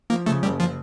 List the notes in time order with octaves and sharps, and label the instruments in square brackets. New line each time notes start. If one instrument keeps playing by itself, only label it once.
[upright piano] F3 [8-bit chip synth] A#3
[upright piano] C#3 [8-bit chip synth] A3
[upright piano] F#1 [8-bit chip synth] G3
[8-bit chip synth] F3